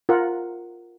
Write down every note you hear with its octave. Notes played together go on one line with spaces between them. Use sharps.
F4 A#4 F#5